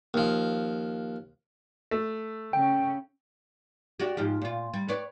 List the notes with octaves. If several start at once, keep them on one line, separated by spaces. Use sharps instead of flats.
D#2 F3
A3
C#3 C#4 G5
D4 F#4 G4
G#2 F3 G4
A#2 F4
G3
B4 C#5 D5